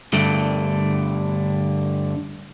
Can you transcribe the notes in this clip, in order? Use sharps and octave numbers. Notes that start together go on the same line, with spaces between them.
G2 D3 A3